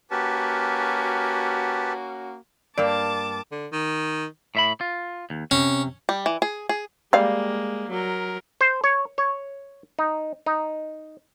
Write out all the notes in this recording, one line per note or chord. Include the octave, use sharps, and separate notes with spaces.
A#3 C#4 F#4 G4 B4 A5
G2 A#3 D5 A5 D6
D3
D#3
A2 E5 B5
F4
D#2
C3 C#4
G3
E3
G#4
G#4
G3 G#3 A#3 F5
F#3 A#4
C5
C#5
C#5
D#4
D#4